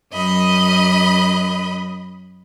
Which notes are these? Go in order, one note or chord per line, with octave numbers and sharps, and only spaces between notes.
F#2 D#5 B5